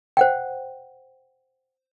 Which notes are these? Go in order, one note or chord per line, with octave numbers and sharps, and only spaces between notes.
C5 F#5 G5